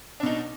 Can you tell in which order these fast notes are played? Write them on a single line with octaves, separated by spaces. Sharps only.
D4 B2 D#4